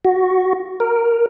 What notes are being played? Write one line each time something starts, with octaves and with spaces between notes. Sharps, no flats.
F#4
A#4